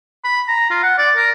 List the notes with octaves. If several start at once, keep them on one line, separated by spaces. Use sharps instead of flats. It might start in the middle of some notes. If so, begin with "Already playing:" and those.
B5
A#5
F4
F#5
D5
A#4